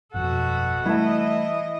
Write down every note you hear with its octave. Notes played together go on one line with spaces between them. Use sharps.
G1 F2 B2 F#4 A4 F#5
E3 G3 A3 E4 D#5 A5